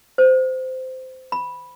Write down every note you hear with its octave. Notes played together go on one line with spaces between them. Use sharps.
C5
B5